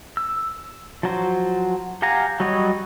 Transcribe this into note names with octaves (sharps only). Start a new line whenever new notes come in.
E6
F3 F#3 C5
G4 F5 F#5 G#5 A#5
F#3 G3 C#5 D#5